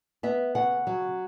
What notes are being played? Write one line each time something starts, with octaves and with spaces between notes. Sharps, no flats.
B3 E5
C#3 F#5
F#3